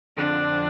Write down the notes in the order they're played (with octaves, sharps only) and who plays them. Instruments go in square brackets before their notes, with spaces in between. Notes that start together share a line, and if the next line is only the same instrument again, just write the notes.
[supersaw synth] F2 D3 F3 C4 [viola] D4